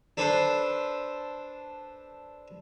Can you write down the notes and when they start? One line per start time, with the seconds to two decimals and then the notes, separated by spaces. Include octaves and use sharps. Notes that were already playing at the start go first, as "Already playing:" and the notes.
0.17 D4 A4 B4 C5